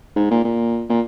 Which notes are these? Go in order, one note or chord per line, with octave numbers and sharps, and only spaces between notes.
G#2
A#2
A#2
A#2